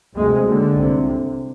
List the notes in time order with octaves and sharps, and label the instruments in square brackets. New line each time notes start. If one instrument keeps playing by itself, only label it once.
[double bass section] D2 C3 G#3
D#2 D3
C2 C3